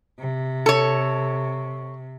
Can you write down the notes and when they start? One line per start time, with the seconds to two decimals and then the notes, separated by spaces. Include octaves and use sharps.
0.18 C3
0.66 A4 C#5